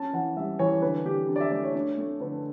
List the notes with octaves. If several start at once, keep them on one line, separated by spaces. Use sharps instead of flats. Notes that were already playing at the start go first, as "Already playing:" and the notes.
Already playing: C#4 A5
E3 F#5
G3 E5
E3 C#5
D3 B4
D3 G4
D4
D5
E5
A3 D5
C#5
D4
A3
D3 B4